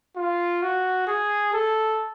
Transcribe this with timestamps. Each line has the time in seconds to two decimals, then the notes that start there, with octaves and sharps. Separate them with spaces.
0.16 F4
0.62 F#4
1.07 G#4
1.53 A4